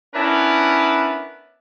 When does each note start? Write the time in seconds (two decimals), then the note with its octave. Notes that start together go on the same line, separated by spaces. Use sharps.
0.15 B3 C#4 D4 E4 A#4 B4